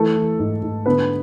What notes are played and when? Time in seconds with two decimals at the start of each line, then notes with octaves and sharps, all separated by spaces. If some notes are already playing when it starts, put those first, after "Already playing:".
Already playing: E3 A3 A4
0.16 E3
0.39 G#2
0.63 G#2
0.86 D3 B3 B4